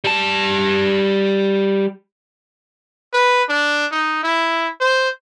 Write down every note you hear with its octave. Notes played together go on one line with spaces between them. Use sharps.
G3 A5
B4
D4
D#4
E4
C5